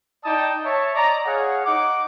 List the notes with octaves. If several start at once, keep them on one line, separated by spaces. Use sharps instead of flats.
D#4 D5 G5 A5 D#6
C#5 E5 A5
D5 D#5 A#5
G#4 C#5 F5 F#5
D#4 F#5 D6